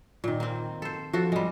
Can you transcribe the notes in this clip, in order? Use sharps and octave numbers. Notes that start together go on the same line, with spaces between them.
A#2 D#3
A#3 C4
A4 C5
F3 F#4 A4
G3 G#3